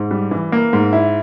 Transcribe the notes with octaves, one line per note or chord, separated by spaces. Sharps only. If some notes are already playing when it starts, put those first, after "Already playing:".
Already playing: G#2
G3
E3
A#3
G#2
E4